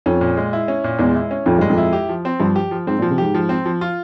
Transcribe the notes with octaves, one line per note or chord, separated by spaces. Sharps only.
F2 C#4
A#2
G#3
E4
C#4
A#2
E2 G#3
E4
C#4
F2 A#2
G2 G#3
F2
E4
G4
F3
C4
G2 F3
G4
F3
G#2 C4
A#2
F3
C3
G#2 G4
F3
C4
F3
F4